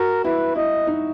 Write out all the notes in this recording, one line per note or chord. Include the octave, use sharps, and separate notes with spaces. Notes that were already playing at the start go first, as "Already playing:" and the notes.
Already playing: F#4 A#4
E4 B4
E4 D#5
D#4